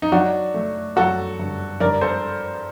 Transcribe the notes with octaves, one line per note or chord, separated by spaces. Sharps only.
D#4
F#3 D4 F#4
A3
F#3 F#4 A4
G2
G2 A#4 D5
A4 C5